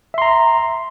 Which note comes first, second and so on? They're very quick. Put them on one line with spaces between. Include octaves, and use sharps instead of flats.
E5 C6 A#5